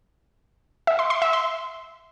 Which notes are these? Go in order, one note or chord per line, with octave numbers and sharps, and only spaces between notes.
E5
C6
C6
E5
C6